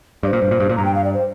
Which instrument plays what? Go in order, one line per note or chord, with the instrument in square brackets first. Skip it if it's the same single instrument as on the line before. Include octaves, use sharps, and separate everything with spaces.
[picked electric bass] G2 [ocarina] D5
[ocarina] C5
[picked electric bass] A#2
G2
A#2
G2
A#2
[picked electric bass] G2 [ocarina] A#5
[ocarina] G5
F5
D5
C5